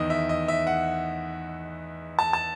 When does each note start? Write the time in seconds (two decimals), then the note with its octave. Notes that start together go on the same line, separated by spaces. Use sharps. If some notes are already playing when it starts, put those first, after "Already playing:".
Already playing: E2 D#3 D#5
0.10 E5
0.29 D#5
0.48 E5
0.67 F#5
2.19 A5
2.33 A5